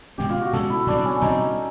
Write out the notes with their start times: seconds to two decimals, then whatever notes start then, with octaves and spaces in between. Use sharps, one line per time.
0.18 B2 G#3 C#4 G4
0.30 F4
0.41 F#4
0.53 B2 G#3 C#4 A4
0.70 E4
0.87 B2 G3 C4 D4
1.05 C#4
1.21 B2 G3 C4 D#4